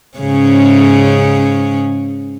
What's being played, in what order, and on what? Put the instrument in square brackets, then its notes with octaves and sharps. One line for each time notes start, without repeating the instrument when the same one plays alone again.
[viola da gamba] G#2 C#3 C#4